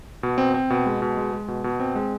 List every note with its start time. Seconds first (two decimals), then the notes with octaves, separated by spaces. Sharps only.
0.23 B2
0.38 C4
0.54 C4
0.70 B2
0.86 G#3
1.02 B2
1.17 G#3
1.33 G#3
1.48 B2
1.64 B2
1.80 C4
1.95 G#3